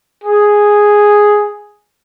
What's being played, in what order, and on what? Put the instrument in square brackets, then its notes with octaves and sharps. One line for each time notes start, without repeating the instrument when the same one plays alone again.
[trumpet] G#4